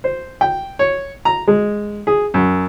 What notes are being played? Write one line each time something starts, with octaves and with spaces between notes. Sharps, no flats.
C5
G5
C#5
A#5
G#3
G#4
F#2